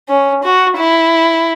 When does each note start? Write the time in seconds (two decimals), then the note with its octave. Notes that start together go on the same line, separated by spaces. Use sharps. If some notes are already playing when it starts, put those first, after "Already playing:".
0.09 C#4
0.44 F#4
0.77 E4